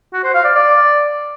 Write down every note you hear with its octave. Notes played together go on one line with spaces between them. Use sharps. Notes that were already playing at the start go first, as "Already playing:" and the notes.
F#4
C5
F5
D5
D5